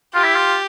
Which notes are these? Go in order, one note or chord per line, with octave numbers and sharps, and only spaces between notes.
F4 G4
E4
F4